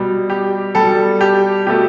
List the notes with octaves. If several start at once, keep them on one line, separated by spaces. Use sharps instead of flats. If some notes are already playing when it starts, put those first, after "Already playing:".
Already playing: B2 G3
G4
B2 G3 A4
G4
B2 A3 G4